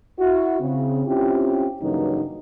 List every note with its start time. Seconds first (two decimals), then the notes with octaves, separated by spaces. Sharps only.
0.19 E4 F#4
0.60 C#3 C4
1.06 C4 C#4 E4 F4 G4
1.82 G2 C#3 E3 F#3 A#3 D#4